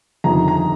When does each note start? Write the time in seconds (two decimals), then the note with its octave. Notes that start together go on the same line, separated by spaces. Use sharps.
0.24 G1 F2 D#3 A#5
0.48 A#5